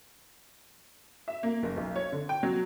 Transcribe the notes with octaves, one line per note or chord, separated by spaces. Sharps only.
E5
A#3
F#1
B1
C#5
D3
G5
F#3